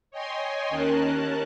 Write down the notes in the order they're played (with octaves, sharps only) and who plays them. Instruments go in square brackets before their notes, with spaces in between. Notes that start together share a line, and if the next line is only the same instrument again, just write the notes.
[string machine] C#5 D#5 G5 G#5 C6
D#2 C#4 A#4 A5 F#6